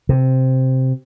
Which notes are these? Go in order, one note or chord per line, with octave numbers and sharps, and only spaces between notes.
C3